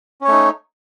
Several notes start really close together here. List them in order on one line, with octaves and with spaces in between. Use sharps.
C#4 C#5 A3 D#4